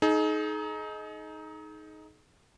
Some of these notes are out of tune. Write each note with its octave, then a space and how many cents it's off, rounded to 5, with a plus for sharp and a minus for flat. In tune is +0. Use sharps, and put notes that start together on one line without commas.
D#4 +5 G#4 +40